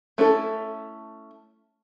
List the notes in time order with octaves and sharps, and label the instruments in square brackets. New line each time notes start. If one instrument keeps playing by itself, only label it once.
[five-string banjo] A3 C#4 E4 A4